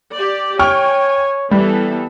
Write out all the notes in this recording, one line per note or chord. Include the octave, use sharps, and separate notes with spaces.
G4 D5
C#5 G5 G#5 C#6 F6
E3 G3 B3 A4